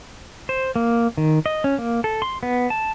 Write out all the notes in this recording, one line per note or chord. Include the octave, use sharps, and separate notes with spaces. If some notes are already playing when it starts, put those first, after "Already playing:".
C5
A#3
D#3
D#5
C#4
A#3
A4
C6
B3
A5